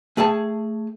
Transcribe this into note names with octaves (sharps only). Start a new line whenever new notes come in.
A3 G#4 G5 A5